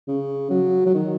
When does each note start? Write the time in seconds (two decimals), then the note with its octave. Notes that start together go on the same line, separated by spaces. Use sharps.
0.08 C#3
0.50 F#3
0.86 F#3
0.94 D#3